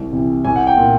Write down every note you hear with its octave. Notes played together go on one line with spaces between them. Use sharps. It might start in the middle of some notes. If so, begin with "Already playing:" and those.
Already playing: C2
C3 E3
C2 G#5
F#5
G5
A#2